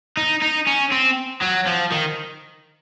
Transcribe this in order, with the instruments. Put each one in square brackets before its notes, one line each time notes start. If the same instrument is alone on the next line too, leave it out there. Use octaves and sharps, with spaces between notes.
[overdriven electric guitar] D#4
D#4
C#4
C4
F#3
F3
D#3